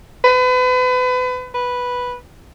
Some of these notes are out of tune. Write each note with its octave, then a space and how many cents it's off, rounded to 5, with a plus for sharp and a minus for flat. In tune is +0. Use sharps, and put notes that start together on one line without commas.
B4 +35
B4 -5